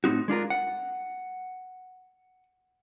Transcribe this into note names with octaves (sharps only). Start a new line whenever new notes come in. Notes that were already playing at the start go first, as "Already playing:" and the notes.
A2 C4 D#4 F#4
G#3 D4 F4 A#4
F#5